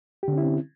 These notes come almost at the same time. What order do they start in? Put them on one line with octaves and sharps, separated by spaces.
G4 D3 C#4 E4 C4